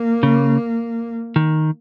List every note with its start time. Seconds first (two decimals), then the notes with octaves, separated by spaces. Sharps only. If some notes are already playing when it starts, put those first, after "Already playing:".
Already playing: A#3
0.23 C#3
1.36 D#3